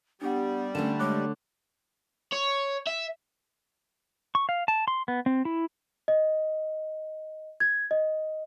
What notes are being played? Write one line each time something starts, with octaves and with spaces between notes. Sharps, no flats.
G3 B3 D4 G4 F#5
D3 A3 C#4 E7
G#3 C#5 D6 F#6
C#5
E5
C#6
F5
A5
C6
B3
C4
E4
D#5
G#6
D#5